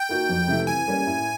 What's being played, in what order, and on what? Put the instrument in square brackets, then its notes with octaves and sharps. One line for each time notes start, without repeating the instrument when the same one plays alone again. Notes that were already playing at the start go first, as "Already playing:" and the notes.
Already playing: [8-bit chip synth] G5
[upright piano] A#3 D#4 F#4
F2
C3 E3 A3
[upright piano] E3 [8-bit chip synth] G#5
[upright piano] G3 A#3 C#4
A2